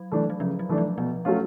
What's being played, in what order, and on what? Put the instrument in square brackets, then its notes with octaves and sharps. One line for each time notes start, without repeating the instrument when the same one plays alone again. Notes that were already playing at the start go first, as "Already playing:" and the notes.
Already playing: [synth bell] F#3
[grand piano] E3 A3 D4
[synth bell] F#3
[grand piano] C#3 [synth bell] F3
[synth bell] F#3
[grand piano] E3 A3 D4
[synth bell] F3
[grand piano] B2 [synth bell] F3
[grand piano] F#3 A3 C#4 F4